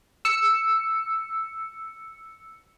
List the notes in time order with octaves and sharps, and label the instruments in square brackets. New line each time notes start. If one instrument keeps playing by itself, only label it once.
[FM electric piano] E6 C#7